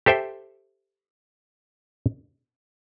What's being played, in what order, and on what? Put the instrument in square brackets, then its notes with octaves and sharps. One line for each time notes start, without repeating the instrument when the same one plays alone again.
[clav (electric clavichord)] G4 A4 C5 E5 G5